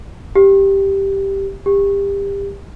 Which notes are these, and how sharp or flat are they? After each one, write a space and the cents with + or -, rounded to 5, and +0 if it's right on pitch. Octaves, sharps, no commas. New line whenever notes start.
G4 +0
G4 +25